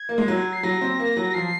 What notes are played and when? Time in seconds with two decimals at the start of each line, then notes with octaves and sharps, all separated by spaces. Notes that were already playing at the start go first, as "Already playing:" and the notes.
Already playing: G#6
0.09 A#3
0.18 G#3
0.28 F#3
0.53 C7
0.63 F#3 A#6
0.81 C4
1.00 A#3
1.17 F#3
1.34 F3 C7